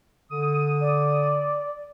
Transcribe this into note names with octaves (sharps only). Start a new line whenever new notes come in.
D3 D#6
D5